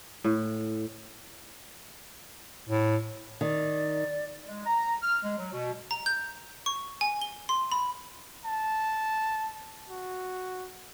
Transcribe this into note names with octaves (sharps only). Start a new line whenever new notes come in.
A2
A2
D#3 D5
G#3
A#5
F6
G#3
F#3
B2
A#5
G6
C#6
G#5
G7
C6
B5
A5
F#4